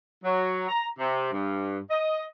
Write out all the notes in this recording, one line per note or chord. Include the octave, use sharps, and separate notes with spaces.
F#3
A#5
C3
G2
D#5